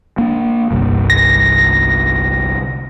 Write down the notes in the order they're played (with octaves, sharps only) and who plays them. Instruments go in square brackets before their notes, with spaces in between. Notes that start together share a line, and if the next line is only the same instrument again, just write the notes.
[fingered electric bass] A#3 D4
G1 C2 G2
[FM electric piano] A#6